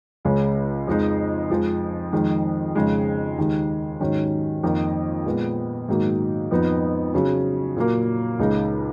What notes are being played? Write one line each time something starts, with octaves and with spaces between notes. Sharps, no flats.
C#2 C#3 G#3 C#4
F2 F3 G#3 D#4
F2 F3 G#3
F2 D#3 G#3
F2 C#3 G#3 D#4
D#2 D#3 G#3
G#2 D#3 F#3 C#4
F2 D#3 A#3
A#2 G#3 B3
G#2 D#3 F#3 A#3
F2 F3 B3 D#4
C#3 F#3 C#4
A#2 F#3 A#3
C#2 C#3 G#3 D#4